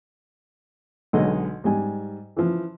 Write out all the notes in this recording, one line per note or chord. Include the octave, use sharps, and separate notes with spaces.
B1 D3 G#3 D#5
G#2 G3 G#5
E3 F3